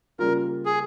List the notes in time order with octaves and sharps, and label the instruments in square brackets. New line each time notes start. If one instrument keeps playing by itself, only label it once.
[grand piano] C#3 G3 A#3 F4 [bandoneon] A#4
[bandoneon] G#4